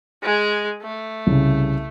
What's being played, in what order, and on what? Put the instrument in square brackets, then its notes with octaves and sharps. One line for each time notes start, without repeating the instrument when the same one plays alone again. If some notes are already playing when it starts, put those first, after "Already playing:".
[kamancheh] G#3 G#4
A3
[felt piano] C2 C#3